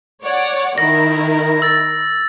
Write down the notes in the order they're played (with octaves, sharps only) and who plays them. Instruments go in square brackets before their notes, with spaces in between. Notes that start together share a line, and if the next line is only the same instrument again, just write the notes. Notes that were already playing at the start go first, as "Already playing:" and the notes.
[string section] C#5 D5 F#5
[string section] D#3 E4 A#4 [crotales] A#6
[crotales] E6 A6